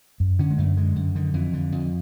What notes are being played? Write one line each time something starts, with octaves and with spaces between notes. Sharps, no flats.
F#2
D3 C#4
G#3
F#2 A3
D3 G#3
F#2
D3 D#3
F2 E3
D3
F2